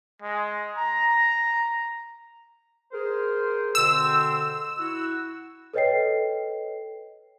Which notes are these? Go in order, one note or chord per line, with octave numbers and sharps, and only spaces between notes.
G#3
A#5
G#4 A#4 C5
B2 D3 C4 E6
E4 F#4
A4 B4 C#5 D#5 G5 C7